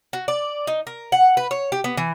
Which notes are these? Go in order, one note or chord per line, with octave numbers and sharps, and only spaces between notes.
F#4
D5
D#4
A#4
F#5
B4
C#5
G4
B3
E3